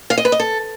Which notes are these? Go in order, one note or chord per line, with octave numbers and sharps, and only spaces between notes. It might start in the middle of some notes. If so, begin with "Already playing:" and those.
F5
D#5
B4
D#5
A4